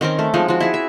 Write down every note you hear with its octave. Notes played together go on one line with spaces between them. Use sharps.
D#3 C4 C#4 A#4
A3
F3 G#3 D#4
F3 F#4
E4 G#4
E5